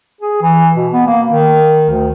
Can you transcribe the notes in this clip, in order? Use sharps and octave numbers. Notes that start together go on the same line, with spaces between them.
G#4
E3
B2
B3
A#3
D#3
D2